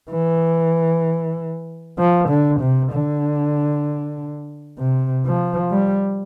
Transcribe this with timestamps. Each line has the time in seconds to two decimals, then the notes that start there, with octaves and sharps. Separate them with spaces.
0.11 E3
1.99 F3
2.29 D3
2.61 C3
2.92 D3
4.79 C3
5.26 F3
5.71 G3